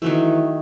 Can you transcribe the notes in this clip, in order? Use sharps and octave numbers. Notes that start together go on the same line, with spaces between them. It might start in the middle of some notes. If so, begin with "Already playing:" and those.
D#3 E3 F#3 A3